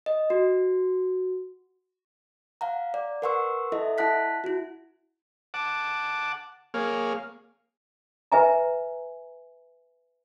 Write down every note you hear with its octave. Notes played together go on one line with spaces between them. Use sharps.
D#5
F#4
F5 F#5 A#5
D5
A#4 B4 F#5 C6 C#6 E6
E4 A4 D#5 E5
E4 F#5 A5 F#6 B6
E4 F#4
F#5 A5 D6
A#3 G#4 C#5 F5
B4 E5 G#5 A#5